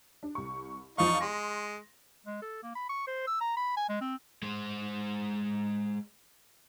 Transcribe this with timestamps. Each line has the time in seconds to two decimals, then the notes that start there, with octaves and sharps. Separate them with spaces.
0.23 D4
0.35 C2 C#6
0.98 E2 F3 D#4 F5 C#6
1.20 G#3 C6 A#6
2.26 G#3
2.42 A4
2.63 A#3
2.76 B5
2.89 C#6
3.07 C5
3.27 E6
3.41 A#5
3.57 B5
3.77 G#5
3.89 G#3
4.01 C4
4.43 G#3 C5